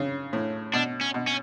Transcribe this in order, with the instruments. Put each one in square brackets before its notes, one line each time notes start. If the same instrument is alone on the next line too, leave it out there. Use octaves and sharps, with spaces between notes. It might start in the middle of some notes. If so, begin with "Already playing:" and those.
Already playing: [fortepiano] C#3
A2
[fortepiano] B2 [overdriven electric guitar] D4
[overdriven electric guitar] C#4
[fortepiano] B2
[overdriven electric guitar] C#4